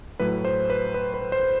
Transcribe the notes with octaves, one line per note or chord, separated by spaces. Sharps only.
A2 F#3 B4
C5
B4
B4
B4
C5